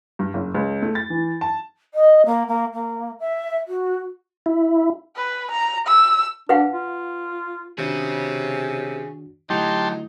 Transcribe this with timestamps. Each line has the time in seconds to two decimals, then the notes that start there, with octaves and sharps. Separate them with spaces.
0.19 G2
0.34 F#1
0.54 C#2
0.82 A3
0.95 A6
1.10 E3
1.41 A5
1.94 D#5
2.26 A#3
2.48 A#3
2.74 A#3
3.20 E5
3.68 F#4
4.46 E4
5.16 B4
5.51 A#5
5.87 E6
6.49 D4 B4 F5 F#5
6.73 F4
7.78 C3 D#3 D4 F#4 G#4 C#5
9.50 D3 F#3 A3 D#4 E4 G4 A5 C6